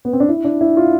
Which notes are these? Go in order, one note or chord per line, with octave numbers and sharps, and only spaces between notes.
B3
C4
D4
E4
D4
E4
F4